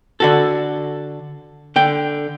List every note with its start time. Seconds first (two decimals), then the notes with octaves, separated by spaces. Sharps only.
0.20 D3 F#4 A4
1.76 D3 G5